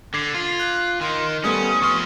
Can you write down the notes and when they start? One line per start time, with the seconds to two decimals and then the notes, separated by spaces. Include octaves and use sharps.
0.14 D3 D6 G#6 C7
0.34 F4
0.59 F#6
1.01 D#3 C6
1.44 G3 A3 B3 C#4 D#6
1.82 F2 C6 C#6 F6